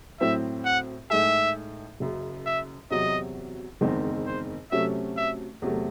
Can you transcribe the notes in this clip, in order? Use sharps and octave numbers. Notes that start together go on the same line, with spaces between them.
A2 F#3 C4 E4 C5 E5
F#5
A2 G#3 D#4 G#4 E5
F#1 F#2 C#3
E5
E2 C3 F#3 D#5
F#1 E2 D#3 G#3 C4
C5
C3 F#3 A3 C#4 E5
E5
E2 C3 F#3 A3